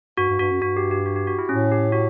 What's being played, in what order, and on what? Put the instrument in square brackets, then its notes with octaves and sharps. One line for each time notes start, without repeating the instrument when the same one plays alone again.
[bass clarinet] G2 [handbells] F#4
[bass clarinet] G2
[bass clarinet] G2 [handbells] F#4
[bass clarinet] F#2
[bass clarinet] G2 [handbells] F#4
[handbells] G4
G4
F#4
G4
F#4
E4
[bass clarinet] A2 [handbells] C#4
[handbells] G4
F#4